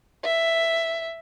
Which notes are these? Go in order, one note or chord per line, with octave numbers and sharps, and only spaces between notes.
E5